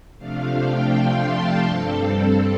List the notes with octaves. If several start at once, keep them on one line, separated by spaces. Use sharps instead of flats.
C3 F3 A3 D4 F5
G5
C6
A5
G2 G3 C4 A4